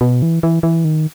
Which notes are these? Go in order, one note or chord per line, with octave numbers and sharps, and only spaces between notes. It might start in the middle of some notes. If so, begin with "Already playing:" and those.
B2
E3
E3
E3
D#3